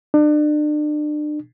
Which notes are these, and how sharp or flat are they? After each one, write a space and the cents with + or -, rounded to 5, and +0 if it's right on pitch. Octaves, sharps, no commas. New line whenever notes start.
D4 +35